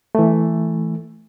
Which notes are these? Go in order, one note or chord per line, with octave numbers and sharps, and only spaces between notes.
E3 A3